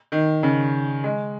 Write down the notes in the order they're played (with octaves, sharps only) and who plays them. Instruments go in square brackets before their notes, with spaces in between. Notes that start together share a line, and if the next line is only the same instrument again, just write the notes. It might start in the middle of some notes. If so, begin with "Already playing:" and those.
[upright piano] D#3
C#3
G#3